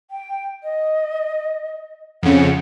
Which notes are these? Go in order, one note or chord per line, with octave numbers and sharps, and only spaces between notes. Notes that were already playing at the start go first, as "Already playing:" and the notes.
G5
D#5
F2 C#3 F#5